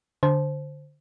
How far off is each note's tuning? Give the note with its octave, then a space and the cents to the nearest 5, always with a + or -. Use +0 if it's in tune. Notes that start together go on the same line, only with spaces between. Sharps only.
D3 +0 C5 +0 A5 -30